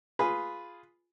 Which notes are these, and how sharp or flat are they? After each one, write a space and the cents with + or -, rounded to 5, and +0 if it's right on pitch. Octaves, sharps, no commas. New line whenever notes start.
F4 +0 G#4 +0 B4 +0